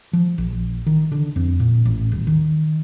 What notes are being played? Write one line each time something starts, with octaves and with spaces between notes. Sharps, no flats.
F3
A#1
D#3
D3
F2
A#2
A1
D#1
D#3